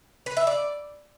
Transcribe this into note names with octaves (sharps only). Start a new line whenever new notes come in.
B4
E5
D5